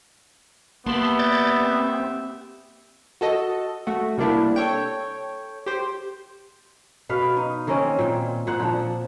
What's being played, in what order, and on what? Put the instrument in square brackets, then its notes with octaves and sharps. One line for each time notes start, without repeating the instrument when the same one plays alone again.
[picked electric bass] A#3 [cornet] B3 [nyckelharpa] G4 E5 [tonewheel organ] A5 B5 C6
[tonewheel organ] D5 G6 A6
C4
[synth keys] F#4 A4 D#5
A3 F#4
C3 G3 A#3 D4 E4 G4
A4 C#5 G5
G4 C5
[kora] B2 B4 F5
D#4
D#3 A#3 C4 C#4
A#2 G5
A#2 C5 F#5
F3 D4